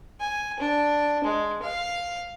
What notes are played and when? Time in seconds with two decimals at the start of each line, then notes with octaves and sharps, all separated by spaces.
0.21 G#5
0.60 D4
1.24 G#3
1.63 F5